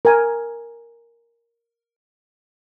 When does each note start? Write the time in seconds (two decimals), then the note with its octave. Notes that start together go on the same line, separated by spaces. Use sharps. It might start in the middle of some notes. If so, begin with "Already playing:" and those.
0.05 A#4 G#5